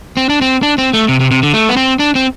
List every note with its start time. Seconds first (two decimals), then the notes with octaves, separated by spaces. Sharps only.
0.17 C4
0.29 D4
0.41 C4
0.63 D4
0.78 C4
0.93 A3
1.08 C3
1.20 C3
1.31 C3
1.43 D3
1.54 A3
1.69 B3
1.77 C4
1.99 D4
2.15 C4